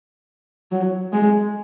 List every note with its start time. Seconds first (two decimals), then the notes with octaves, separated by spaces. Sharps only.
0.72 F#3
1.13 G#3